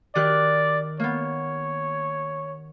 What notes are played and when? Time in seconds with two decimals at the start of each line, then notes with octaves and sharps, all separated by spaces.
0.15 D#3 G4 D5 F#6
1.00 A#3 B3 C#5